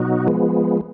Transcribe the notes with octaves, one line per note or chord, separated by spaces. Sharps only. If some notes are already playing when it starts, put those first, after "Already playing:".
Already playing: B2 F#3 D#4 F#4
F3 G#3 B3